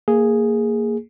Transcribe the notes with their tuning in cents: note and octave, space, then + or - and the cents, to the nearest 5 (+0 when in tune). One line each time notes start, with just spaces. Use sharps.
A#3 -15 G#4 +0